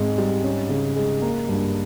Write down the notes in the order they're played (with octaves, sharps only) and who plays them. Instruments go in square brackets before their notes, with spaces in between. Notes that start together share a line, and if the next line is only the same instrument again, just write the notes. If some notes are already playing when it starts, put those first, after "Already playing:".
Already playing: [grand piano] G#2 G#3 C4
G3
C#4
C#3
G#3
A#3
G2